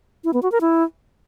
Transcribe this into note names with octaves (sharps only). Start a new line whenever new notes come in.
E4
B3
F#4
A#4
E4